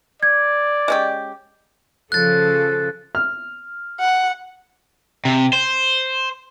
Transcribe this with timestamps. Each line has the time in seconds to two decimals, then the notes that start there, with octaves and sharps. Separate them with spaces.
0.23 D5 G#6
0.88 G#3 C#4 G4
2.12 C#3 F3 A4 F#6 A6
3.15 F6
4.00 F#5
5.25 C3
5.53 C5